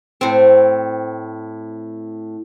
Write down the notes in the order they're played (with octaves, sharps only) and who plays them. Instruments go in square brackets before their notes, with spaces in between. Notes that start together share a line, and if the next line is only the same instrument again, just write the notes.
[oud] A2 C4